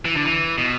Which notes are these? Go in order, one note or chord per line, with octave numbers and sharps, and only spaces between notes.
E3
D3
E3
B2